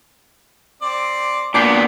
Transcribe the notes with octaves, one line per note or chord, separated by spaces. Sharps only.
C4 D5
A#2 B3 D4 D6 G6 C7